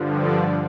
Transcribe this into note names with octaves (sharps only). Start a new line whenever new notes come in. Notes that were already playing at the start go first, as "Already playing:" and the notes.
Already playing: G2 D3 F3
D5